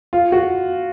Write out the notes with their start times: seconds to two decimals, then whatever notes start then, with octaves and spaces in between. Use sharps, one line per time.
0.13 F4
0.32 F#4